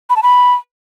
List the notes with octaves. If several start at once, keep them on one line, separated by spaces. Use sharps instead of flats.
B5
A5
B5